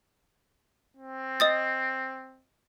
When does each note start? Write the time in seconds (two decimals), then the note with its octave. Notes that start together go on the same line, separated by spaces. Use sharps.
0.97 C4
1.40 D#5 D#6 A6